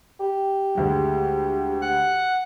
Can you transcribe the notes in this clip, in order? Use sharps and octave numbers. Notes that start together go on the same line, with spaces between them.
G4
D2 G#3
F#5